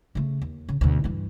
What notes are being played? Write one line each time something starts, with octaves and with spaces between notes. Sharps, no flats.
C#3 A3
D#2
C#3
D2 B2
G2 E3